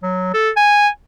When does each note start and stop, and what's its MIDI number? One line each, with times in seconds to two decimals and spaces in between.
0.03 0.31 54
0.34 0.50 69
0.56 0.88 80